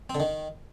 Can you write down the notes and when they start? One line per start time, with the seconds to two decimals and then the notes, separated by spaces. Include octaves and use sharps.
0.10 C4
0.15 D3
0.20 D#3